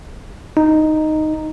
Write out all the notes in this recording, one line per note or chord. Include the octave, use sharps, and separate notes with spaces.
D#4